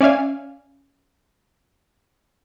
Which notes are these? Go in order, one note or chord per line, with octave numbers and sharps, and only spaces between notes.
C#4 D5 E5 F5 G#5